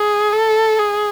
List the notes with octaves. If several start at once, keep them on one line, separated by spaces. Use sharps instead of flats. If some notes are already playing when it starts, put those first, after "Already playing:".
Already playing: G#4
A4
G#4